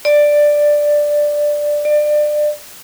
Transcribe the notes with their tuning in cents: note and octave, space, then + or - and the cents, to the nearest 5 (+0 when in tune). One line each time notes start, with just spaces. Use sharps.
D5 +5
D5 +25